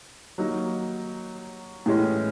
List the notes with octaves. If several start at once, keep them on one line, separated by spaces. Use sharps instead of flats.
F#3 A#3 D#4
A2 E3 G#3 C#4